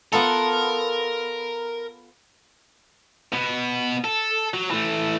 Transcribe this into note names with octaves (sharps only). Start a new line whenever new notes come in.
B3 F4 A4 A#4
B2 B3
A4
F#3
E3 A3